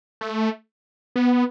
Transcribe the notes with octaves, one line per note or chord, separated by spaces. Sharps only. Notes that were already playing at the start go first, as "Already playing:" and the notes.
A3
B3